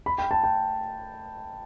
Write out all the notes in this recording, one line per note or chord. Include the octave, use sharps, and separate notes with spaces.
B5
G5
A5
G5